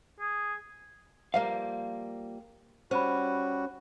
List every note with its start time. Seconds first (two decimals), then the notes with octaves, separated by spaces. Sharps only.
0.20 G#4
1.34 F3 G3 A#3 F5
2.91 G3 C#4 F#4 C5 B5